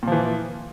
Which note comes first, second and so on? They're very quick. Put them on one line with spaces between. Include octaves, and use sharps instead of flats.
A#2 F3 E3